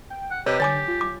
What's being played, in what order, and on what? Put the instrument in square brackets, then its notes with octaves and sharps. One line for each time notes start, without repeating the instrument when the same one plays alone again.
[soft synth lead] G5
[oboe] F#5
[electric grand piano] C3 B4 [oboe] G4 [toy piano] C#5 [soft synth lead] D#5
[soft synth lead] D3 [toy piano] C#5 G#5 D6 [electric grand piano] A6
[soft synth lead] F4
[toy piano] D6